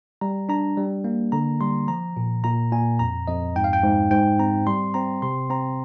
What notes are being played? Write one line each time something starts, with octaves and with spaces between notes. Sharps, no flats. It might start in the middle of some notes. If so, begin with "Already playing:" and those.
G3 A#5
D4 A#5
G3
A#3
D3 A#5
G3 C6
F3 A#5
A#2
A#2 A#5
A#2 G#5
F2 A#5
F2 D#5
G#2 G5
F5
G5
G#2
G#2 G5
C4 A#5
G3 C6
C4 A#5
C3 C6
C4 A#5